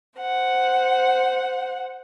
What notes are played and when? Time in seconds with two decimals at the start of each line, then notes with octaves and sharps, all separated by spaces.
0.18 C5 F#5